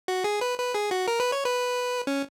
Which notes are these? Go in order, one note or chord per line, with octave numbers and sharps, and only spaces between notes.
F#4
G#4
B4
B4
G#4
F#4
A#4
B4
C#5
B4
C#4